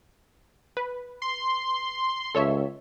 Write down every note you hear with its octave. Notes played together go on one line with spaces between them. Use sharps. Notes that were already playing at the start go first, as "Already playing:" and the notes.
B4
C6
C#2 A4 C#5 E5